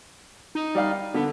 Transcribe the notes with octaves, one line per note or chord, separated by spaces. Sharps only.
D#4
G3 D5 F5
D3 B3